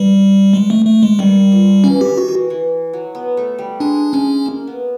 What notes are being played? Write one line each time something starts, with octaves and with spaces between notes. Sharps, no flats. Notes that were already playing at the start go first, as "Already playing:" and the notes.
Already playing: E3 G3
G#3
A3
A3
G#3
D#3 G3
F3
E3 C#4
D#3 G4
F#4
E3
E3
F#3
B3
A3
G3
G#3 D4
G#3 C#4
A#3
B3